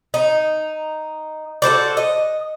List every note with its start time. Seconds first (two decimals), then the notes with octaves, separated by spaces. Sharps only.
0.14 D#4
1.62 F#4 A4 C5 D5
1.97 D#5